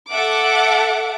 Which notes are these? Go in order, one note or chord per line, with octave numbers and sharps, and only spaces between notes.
A4 E5 F#5 D6